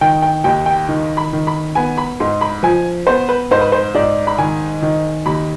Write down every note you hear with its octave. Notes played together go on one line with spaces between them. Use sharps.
D#3 G5
G5
D#2 G5
G5
D#3
B5
D#3
B5
B3 G#5
B5
G#2 C6
B5
F3 G#5
B3 C5
B4
G#2 C5
B4
C5
G#2 D5
B5
D#3 G#5
D#3
D#2 B5